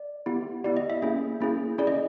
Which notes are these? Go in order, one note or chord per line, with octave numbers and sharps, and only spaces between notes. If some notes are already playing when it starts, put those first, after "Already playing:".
Already playing: D5
B3 E4 G4
B3 E4 G4 D5
D#5
E5
A#3 C#4 E4 G#4
A#3 C#4 E4 G#4
C#4 E4 G#4 D5
D#5